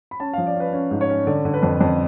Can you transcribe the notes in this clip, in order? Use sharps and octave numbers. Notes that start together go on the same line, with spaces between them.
B5
C#4 A5
F3 F5
D5
C#4 B4
C#4
G#2
C#5
C#4
D3 D5
D3
B4
F2
F2